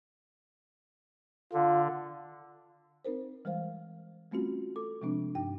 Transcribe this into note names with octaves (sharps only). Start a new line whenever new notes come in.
D3 F4
C4 D#4 A#4 C5
E3 G3 G#3 C5 F5
G3 A3 C4 C#4 F4 F#4
A4 D6
C3 F3 G#3 C4 D4
G2 D#4 G5